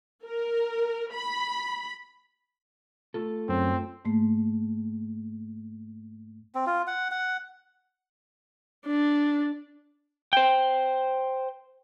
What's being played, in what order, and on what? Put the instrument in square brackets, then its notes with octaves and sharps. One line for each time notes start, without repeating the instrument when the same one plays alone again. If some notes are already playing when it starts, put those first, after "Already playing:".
[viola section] A#4
B5
[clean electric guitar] A3 F4 A4
[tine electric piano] F#2 [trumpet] C4
[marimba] G#2 A3 A#3
[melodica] C4
F4
F#5
F#5
[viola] D4
[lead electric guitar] C5 G5